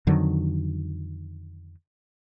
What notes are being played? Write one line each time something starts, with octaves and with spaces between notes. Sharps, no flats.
F2 D3 D#3 F#3